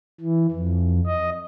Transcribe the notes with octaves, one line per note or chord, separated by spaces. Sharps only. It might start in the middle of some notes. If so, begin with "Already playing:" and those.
E3
F2
D#5